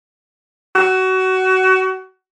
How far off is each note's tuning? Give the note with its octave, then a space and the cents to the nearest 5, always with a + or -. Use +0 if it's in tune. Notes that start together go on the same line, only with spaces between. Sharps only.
F#4 +25